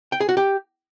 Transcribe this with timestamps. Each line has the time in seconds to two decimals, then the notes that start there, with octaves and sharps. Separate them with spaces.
0.12 G5
0.20 G#4
0.29 F#4
0.37 G4